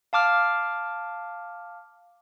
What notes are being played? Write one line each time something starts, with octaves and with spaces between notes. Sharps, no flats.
F5 A5 D6 F6